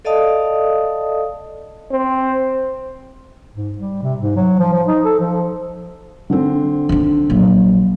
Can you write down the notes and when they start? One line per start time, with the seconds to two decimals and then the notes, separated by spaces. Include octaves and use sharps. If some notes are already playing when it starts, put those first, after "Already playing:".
0.05 A4 D5 D#5 F5 A5 D#6
1.91 C4
3.56 G#2
3.78 G3
4.03 C3
4.21 G#2
4.36 F#3
4.59 F3
4.73 F3
4.87 D#4
5.04 A4
5.20 F3
6.30 D3 C4
6.89 D#3 D4
7.30 A#1 F#3